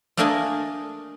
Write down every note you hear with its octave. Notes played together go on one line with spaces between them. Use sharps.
A3 A#3 D4 A#4 D#5 G#5